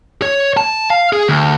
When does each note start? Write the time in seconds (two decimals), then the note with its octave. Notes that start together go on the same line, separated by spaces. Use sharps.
0.22 C#5
0.57 A5
0.90 F5
1.13 G#4
1.29 D2